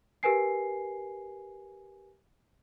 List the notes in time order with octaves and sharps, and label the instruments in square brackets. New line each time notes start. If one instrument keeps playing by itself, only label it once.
[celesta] G4 A#4 B4 G#5 C7